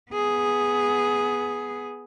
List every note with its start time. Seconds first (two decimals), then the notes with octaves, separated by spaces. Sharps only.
0.12 B3 G#4